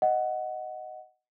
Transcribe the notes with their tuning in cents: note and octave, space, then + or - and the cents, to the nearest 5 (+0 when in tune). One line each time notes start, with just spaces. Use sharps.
D#5 +0 F#5 +5